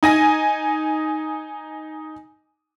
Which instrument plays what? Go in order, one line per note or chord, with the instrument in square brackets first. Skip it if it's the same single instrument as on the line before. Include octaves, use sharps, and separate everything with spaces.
[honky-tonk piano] D#4 G#5 A#6